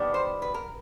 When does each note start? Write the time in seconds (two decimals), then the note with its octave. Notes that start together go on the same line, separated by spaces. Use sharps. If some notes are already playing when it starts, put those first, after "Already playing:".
Already playing: D#3 G3 B3 D4
0.14 C5
0.42 B4
0.54 A#4